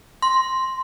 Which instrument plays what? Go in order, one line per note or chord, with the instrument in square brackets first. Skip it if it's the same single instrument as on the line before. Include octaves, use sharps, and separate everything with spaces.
[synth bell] C6